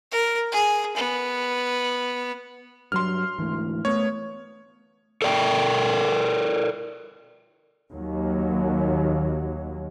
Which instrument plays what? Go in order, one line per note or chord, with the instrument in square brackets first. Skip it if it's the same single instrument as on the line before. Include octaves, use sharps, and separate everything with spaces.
[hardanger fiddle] A#4
G#4
B3
[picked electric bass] G2 F#3 [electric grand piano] C6 F6
[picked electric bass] D2 G#2 E3
[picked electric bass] A3 B3 [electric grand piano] C#5
[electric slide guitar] A4 A#4 D5 F#5 G5
[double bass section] D#2 F#3